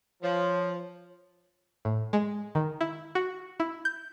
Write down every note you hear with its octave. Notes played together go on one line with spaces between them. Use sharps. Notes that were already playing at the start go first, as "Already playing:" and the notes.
F3 C#5
A2
G#3
D#3
E4
F#4
E4
G6